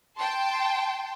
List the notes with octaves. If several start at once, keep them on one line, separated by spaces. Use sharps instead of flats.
G5 A5 C6